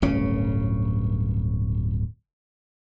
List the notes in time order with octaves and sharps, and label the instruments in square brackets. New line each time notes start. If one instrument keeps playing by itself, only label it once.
[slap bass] D1 G1 C#3 C#4